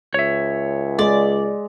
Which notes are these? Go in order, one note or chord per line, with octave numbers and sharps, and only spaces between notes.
C#2 C#5 E5
G#3 D5